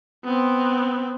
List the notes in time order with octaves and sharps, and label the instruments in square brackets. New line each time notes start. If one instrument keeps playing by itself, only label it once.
[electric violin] B3 C4